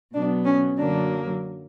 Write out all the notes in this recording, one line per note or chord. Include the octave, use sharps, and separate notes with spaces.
B2 F#3 B3 D4
C#4
F#2 D3 F#3 A#3 D4